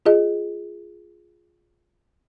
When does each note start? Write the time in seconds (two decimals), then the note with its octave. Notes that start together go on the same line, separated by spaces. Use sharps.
0.06 F4 G#4 D#5